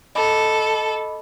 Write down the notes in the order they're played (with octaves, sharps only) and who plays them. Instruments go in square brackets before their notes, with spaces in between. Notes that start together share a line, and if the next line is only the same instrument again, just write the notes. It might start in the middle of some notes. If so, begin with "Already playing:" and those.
[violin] A4 [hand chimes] D#5 B5 D6